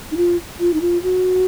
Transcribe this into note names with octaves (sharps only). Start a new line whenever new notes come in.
D#4
F4
F4
D#4
F4
F#4